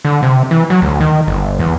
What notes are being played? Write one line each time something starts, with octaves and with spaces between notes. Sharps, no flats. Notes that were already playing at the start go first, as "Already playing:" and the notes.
D3
C3
E3
F#3
D2
D#3
G1
E2